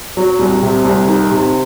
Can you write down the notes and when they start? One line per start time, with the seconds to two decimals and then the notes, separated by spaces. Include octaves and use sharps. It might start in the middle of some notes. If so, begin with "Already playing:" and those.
0.17 F#3
0.39 C2
0.62 C3
0.85 C2
1.08 D#3
1.31 C3